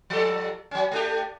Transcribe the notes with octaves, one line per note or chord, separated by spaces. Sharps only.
F3 G3 A4
F#3 C#4
A3 D4 G4